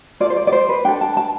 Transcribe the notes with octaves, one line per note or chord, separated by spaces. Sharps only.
F4 A4 D5
C5
D5
D5
C5
B4
D4 A4 G5
A5
A5